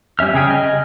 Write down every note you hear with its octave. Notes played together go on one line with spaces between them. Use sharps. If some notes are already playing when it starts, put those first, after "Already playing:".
G3 C#4 E5 F6
C#3 G#4 G5 G#5
D#5 F6